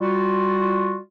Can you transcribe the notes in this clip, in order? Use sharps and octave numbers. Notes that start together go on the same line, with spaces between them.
G3 F4 F#4